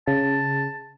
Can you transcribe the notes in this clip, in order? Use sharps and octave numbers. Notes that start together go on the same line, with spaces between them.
C#3 A5